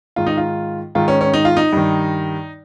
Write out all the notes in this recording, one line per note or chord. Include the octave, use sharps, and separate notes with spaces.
G#2 D#3 F4
D#4
F4
G#2 D#3 F4
C#4
C#4
D#4
F4
D#4
G2 D#3